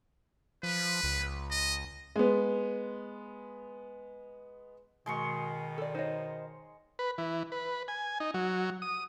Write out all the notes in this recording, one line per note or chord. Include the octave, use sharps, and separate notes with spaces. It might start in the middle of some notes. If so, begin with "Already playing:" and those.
F3 B4
C#2
D#5
G#3 B3
B2 D#3 G#3 C6 C#6
A4 D5
D#4 C5 C#5 D#5
B4
E3
B4
G#5
D#4
F#3
D#6